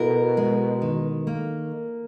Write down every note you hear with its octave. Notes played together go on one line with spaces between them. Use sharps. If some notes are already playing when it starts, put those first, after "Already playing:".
Already playing: B2 E4 A#4
G#3
D#3
A#3